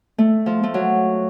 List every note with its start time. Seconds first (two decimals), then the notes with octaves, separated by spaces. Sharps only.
0.18 A3
0.46 F3
0.63 A3
0.74 F#3